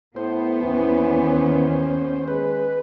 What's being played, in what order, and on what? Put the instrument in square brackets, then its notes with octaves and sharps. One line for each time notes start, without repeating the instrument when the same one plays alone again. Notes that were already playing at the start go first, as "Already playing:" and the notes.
[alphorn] A2 [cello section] B3 [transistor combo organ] C5
[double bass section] D#2 D#3 C#4 [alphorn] E3
[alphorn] G#3 [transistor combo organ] B4